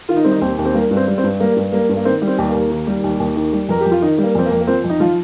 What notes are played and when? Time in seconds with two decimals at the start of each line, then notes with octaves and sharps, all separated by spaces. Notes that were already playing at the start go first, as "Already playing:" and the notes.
0.08 D#3 F4
0.16 D#4
0.24 G3 C4
0.31 D#3 D#4
0.41 D#2 C4
0.58 D#2
0.65 C4
0.74 G3 A#3
0.91 G2
0.97 C4
1.07 G3
1.18 C4
1.23 G2
1.40 G3 A#3
1.56 G2
1.72 G3 A#3
1.89 G2
1.97 A#3
2.05 D#3 C4
2.22 G3
2.27 C4
2.38 D#2
2.49 A#3
2.54 D#2
2.70 D#3
2.87 G3
3.04 D#2
3.20 D#2
3.36 D#3
3.53 G3
3.69 F2 A#4
3.81 F2 G4
3.91 F4
4.01 D#3 D#4
4.18 G3
4.23 A#3
4.35 F2 C4
4.46 A#3
4.51 F2
4.61 A#3
4.67 F3 C4
4.84 F2
4.89 D#4
5.00 F3 F4